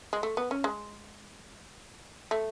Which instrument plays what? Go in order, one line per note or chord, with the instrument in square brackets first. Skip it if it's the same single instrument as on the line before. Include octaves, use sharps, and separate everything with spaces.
[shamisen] G#3
A3
B3
C#4
G#3
A3